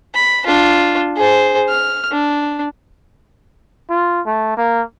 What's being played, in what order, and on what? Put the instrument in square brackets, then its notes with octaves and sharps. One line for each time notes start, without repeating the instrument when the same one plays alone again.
[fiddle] B5
D4 F4
G#4 C5
F6
D4
[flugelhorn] F4
A3
A#3